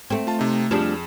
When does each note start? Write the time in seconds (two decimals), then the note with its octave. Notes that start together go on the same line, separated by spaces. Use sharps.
0.10 A3 C4
0.27 F4 A5
0.39 C3 D#4
0.71 F2 F3 G3 D4 G#4 E7